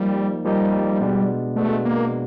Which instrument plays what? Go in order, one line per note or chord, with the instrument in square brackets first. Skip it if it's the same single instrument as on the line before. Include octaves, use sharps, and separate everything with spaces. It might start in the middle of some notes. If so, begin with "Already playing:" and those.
Already playing: [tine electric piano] F3 A#3 D#4 [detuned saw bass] G3
[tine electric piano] F3 A#3 D#4 [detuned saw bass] G3
[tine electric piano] B2 G#3 B3 D4
[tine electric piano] B2 G#3 B3 D4 [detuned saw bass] A3
[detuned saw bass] A#3